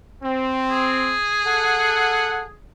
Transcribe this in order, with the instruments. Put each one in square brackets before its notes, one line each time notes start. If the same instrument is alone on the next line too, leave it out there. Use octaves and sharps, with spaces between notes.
[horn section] C4
[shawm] G#4
[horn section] A4 F#5